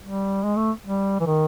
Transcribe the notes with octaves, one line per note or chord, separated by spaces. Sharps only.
G3
G#3
A3
G3
E3
D#3